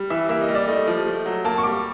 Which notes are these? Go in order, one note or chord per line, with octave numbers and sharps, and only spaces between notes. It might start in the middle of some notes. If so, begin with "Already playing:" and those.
Already playing: G3
E3 E5
A#3 E5
D#5
G3
D5
A3 D#5
F3
A3
F#3
A#3 A5
C#6
G3 D6